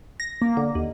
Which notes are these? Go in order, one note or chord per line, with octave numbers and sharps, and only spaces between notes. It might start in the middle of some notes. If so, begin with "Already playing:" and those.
A#6
A#3
D3
D#2